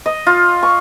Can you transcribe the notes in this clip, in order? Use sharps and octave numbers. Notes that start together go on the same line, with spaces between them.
D#5
F4
C#6